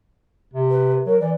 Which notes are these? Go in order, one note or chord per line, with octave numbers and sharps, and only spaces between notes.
C3
B4
F#3 A#4
E3 D5